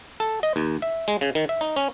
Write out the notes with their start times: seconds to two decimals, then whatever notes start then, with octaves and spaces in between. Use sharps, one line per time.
0.20 A4
0.43 D#5
0.56 D#2
0.82 E5
1.08 G#3
1.21 C#3
1.35 D#3
1.49 E5
1.61 D#4
1.76 C#4